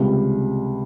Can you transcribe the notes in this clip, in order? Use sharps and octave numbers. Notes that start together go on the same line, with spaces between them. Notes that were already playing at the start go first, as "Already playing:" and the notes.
Already playing: C#2 C3 G3